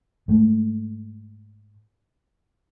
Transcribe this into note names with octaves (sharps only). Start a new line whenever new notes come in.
G#2 A3